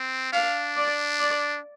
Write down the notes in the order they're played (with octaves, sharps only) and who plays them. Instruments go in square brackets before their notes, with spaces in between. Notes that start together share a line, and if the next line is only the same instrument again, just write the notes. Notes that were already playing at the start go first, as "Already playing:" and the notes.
Already playing: [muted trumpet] C4
[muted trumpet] D4 [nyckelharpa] F5
[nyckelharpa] D5
D5